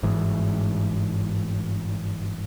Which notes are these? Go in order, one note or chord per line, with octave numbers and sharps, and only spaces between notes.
G1 G#2 E3 G#3